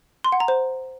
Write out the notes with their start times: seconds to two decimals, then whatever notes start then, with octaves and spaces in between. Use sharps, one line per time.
0.24 C6
0.32 F#5
0.40 A#5
0.48 C5